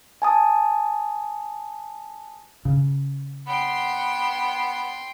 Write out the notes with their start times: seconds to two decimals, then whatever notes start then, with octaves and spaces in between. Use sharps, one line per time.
0.22 G#5 A5 D#6
2.65 C#3
3.47 B3 G5 C6